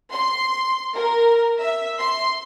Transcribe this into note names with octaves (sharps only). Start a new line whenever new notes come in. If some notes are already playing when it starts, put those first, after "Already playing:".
C6
A#4
E5
C6